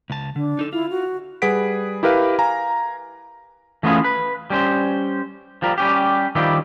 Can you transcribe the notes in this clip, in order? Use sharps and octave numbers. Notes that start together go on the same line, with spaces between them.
C#2 A5
D3 D4
D#4 A4
E4 F4
F#4
G3 G#4 B4 F#5 B6 D7
E4 G4 A#4 B4 F5
F5 G#5 A#5
E3 A3 B3 C#4 F4 G#4
B4
G3 C#4 C5
F3 G3 A#4
G3 C#4 G4
D#3 F3 G3 E4 G4